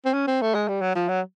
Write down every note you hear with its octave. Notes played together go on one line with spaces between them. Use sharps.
C4
C#4
C4
A3
G#3
G3
F#3
F3
F#3